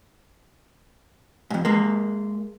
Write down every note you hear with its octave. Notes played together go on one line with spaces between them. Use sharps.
F2 G#2
G#3 A#3